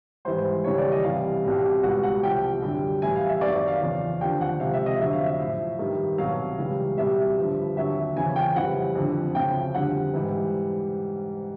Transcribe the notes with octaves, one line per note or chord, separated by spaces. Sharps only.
G#2 E3 G3 C5
D#2 C#3 E3 G3 C#5
D5
D#5
C2 C3 E3 G3 F5
C2 B2 G3
C#2 B2 G3 F#5
F#5
C2 C3 F3 G5
F#2 D3 G3
A2 E3 G3 G#5
F5
E5
F#2 D#3 F#3 D5
D5
F5
E2 C#3 F3
D#2 D3 F3 G5
F#5
C#2 C3 F3 F5
E5
D#5
F2 D3 F#3 E5
F5
E5
A2 F3
G2 D#3 G3
C2 B2 F#3 F5
C#2 C#3 E3 G3
C2 B2 G3 E5
G2 D3 F3
D#2 D3 F#3 E5
E2 C#3 F3 G#5
G5
F2 C#3 E3 G3 F#5
F2 D3 F3
D2 C#3 F3 G5
F2 D3 G3 F#5
G#2 E3 G3